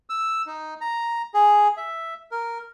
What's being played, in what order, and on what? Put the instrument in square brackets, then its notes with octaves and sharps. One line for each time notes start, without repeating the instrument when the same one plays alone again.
[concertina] E6
D#4
A#5
G#4
E5
A#4